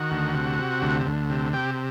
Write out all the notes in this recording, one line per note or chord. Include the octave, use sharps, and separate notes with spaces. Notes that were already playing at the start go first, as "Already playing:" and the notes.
Already playing: D#3 F#4
D2
C3
C3
D2
D2
C3
C3 G4